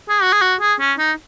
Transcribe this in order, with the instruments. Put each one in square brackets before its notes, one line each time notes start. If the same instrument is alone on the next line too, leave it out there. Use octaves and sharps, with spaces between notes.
[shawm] G#4
F#4
G#4
F#4
G#4
C#4
D#4